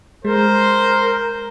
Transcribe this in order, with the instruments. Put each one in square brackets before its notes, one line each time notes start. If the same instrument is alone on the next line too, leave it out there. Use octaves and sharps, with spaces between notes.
[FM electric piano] G#3 [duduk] A#4 [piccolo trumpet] C5